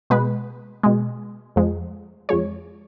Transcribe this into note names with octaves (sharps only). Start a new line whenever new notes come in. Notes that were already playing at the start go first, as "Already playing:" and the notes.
B2 G#3 B4
B2 G#3
F2 F3 G#3
F2 F3 G#3 C#5